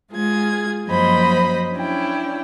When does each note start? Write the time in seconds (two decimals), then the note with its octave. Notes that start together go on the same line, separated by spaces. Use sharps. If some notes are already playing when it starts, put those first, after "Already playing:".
0.11 G#3 F4 G#4 G#6
0.87 F#2 F3 A#3 C5 D#5 B5
1.74 C#4 D4 E4 G5